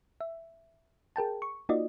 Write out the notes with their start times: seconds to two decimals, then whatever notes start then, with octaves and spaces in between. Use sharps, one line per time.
0.21 E5
1.16 G#4 A#4 G5 A5
1.42 C#6
1.69 A#3 D#4 F4 F#4 D5 D#5